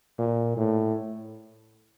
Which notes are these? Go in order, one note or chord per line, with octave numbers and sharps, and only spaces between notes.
A#2
A2